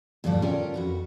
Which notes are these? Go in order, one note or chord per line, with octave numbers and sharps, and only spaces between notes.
D2 G2 A#2 F3 G3 A5
C#4 F4 G4 A4 A#4
F2 F#4 B4